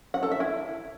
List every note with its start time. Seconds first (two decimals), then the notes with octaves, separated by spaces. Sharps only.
0.14 F#5
0.23 A4
0.31 E5
0.40 E4